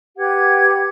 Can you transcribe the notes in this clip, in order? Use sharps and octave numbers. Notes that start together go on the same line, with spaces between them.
G4 B4 F#5 G#6